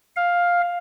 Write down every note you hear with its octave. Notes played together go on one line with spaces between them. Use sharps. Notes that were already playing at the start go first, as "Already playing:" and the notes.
F5